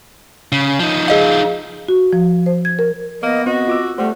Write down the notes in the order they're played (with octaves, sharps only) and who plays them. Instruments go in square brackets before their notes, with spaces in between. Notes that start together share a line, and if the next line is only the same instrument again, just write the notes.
[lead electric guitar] C#3
F3 D#4
[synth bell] G#4 D#5 F5
[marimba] F#4
F3
C5
G#6
A#4
[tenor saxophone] A#3 [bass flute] B3 [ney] D#5
[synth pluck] C4 [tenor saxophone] F#4 [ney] D#5
[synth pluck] F4 D6 E6
[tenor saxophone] G3 [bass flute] A3 [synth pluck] C5 [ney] F#5